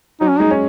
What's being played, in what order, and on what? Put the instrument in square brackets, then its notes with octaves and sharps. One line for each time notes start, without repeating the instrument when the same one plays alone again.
[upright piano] F#3 [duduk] D#4
[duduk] C#4
[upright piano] G#3 [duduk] D#4
[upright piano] C#4